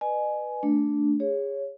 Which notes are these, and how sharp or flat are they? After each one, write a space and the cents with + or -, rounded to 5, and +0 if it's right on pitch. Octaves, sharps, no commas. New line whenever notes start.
B4 +0 D#5 -40 G#5 +15
A3 +0 D4 -5
G#4 -25 C#5 +0